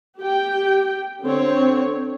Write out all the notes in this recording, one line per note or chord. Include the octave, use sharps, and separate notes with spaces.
G4 G5
D3 C4 C#5